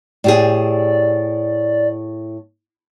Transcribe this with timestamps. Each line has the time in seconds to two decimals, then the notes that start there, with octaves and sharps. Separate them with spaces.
0.24 A2 G4 G#4 D5